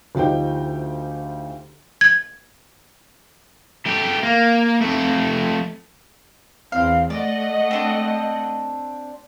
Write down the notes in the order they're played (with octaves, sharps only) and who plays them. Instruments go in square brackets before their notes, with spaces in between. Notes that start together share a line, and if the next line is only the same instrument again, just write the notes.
[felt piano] D2 F3 D#4 G4 G5
[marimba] G#6
[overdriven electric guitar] A3 G4
A#3
F2 A3
[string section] E2 C4 [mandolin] F5
[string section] A3 D#5 F#5 [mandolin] D5
[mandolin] C4 D4